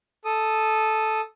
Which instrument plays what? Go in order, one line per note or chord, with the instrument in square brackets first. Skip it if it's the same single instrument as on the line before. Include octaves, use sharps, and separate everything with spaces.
[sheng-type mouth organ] A4 D#6